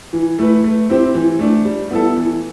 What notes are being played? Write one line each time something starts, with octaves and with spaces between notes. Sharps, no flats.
E3
A3 E4 B4
A3
C4 E4 G4 C5
E3
A3 D4
G3
B3 E4 A4
E3